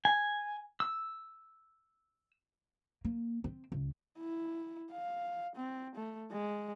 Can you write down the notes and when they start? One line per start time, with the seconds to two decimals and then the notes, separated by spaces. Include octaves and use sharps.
0.05 G#5
0.80 E6
3.05 A#3
3.44 C4
3.72 C#2
4.19 E4
4.92 F5
5.56 C4
5.95 A3
6.31 G#3